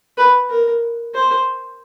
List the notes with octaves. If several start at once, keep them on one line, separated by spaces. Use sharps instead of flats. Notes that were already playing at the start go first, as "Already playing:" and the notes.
B4
A#4
C5